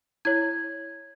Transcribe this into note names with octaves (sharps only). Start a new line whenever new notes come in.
E4 C#5 G#6